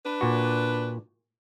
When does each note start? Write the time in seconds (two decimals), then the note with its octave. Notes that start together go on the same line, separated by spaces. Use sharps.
0.05 D4 B4
0.21 A#2 F#4